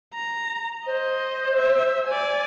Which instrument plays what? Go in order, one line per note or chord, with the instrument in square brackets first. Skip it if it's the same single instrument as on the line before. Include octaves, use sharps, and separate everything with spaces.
[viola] A#5
[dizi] C5 [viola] D#5
[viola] E5
D5 G#5